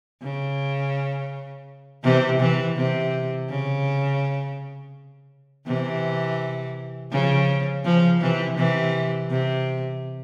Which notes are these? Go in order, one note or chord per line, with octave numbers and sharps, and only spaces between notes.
C#3
C3 E3
C3 E3
C3
C#3
C3 E3
C#3 F3
C#3 F3
C3 E3
C3 E3
C3